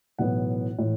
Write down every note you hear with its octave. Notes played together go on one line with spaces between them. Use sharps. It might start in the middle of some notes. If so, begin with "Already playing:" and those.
B1 A2 E3 B3 F#5
A2 E3